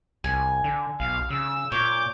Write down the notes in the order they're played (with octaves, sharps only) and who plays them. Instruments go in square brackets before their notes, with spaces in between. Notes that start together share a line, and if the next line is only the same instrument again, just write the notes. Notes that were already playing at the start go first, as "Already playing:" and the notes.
[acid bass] C2 [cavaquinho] G#5
[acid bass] D3
[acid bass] B1 [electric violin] F5
[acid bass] C#3 [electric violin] E6
[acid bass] A#2 [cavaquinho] C#5 [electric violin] D6 G6